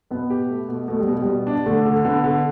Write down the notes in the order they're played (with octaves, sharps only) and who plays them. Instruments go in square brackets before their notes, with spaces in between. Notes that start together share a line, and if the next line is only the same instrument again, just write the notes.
[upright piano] B2 [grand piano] B3
[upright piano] G4
A3
B2
[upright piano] B2 [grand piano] A3
[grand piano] G3
[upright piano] B2
[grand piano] G3
[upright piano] B2
D4
[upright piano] D3 [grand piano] A3
[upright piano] D3
[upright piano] D3 [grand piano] B3
[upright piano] D3